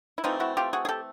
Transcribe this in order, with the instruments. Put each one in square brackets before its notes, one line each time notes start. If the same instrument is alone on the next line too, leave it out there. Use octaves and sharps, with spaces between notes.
[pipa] E4
E3 A3 C4 D#4 F4
E4 F#4
F4 G4
F#4 G#4
G#4
G4 A4